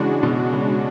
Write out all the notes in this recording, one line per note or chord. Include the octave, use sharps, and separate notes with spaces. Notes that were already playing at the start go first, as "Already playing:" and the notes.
Already playing: C#3 E3 G#3 D4 F#4
B2
C#3